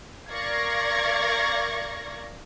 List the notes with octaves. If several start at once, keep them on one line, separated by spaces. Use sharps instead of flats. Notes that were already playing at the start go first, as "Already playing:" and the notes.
A#4 D5 F5 C#6 G#6 A#6